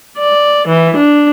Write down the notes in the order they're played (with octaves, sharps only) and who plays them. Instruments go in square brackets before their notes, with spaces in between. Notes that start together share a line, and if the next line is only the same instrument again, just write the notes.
[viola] D5
E3
D4